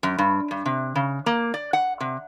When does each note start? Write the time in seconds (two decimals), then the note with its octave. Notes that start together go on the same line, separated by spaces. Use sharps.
0.03 F#2
0.18 G2
0.51 G2
0.66 C3
0.96 C#3
1.26 A#3
1.54 D5
1.73 F#5
2.00 C3